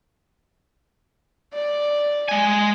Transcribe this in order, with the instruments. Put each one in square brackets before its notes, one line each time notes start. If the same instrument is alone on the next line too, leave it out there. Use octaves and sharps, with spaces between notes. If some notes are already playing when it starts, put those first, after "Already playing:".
[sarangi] D5
[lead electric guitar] G#3 G#5